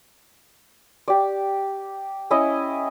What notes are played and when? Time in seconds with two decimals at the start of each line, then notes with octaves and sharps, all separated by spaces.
1.08 G4 D5
2.30 C#4 E4 C#5 D#5